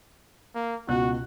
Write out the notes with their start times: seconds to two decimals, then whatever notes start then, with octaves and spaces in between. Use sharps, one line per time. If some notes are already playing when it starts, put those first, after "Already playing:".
0.55 A#3
0.88 C#2 B2 F#4 F#6